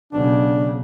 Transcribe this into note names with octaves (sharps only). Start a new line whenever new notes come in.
B1 C#3 D4